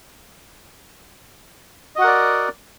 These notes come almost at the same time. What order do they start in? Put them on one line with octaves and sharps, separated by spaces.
D#5 F#4 F#5 A#4 D5